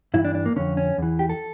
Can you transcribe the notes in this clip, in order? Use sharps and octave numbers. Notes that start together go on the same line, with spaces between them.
G2 E3 E4
D4
D4
A#3
F2 D3 C#4
C#4
E2 E3
G4
A4